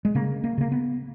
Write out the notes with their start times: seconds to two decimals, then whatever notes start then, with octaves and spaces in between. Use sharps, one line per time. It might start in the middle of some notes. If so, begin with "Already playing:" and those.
0.05 G#3
0.15 C#3 A#3
0.44 A#3
0.58 C#3 A#3
0.72 B3